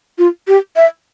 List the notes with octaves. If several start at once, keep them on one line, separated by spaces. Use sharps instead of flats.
F4
G4
E5